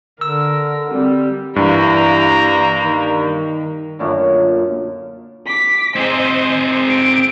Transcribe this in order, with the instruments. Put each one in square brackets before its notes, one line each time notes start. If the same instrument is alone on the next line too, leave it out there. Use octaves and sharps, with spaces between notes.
[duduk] D3 [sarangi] A#4 [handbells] E6
[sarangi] G3 [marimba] C4
[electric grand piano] G2 [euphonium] E3 [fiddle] A#3 [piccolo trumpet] A#5
[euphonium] D#3
[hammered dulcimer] F#2 A#2 D3
[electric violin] D6 B6
[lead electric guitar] C4 G#4 [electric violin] C5 D#5
[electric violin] D7